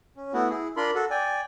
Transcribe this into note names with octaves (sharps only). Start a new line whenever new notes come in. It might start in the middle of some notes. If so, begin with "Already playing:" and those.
C#4
A3 B3 E4 F#4
E4 G#4
D4 F4 A#4 B5 C6
F#4 A4
D5 G5 G#5